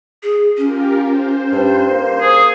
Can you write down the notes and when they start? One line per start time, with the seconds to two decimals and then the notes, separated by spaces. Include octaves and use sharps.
0.23 G#4
0.57 C#4 F4 G4 A#4
1.04 C5
1.52 G2
1.91 A#3
2.21 G#4